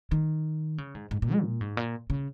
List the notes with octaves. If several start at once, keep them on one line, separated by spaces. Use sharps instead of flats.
D#3
C#3
G#2
G#2
A#2
G#3
A#2
G#2
A#2
C#3